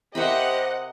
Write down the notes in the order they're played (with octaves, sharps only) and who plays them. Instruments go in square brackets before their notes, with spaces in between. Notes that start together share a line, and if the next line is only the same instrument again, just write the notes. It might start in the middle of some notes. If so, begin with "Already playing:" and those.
[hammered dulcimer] C3 [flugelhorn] G4 [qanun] A#4 C5 B5 [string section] D#5 F#5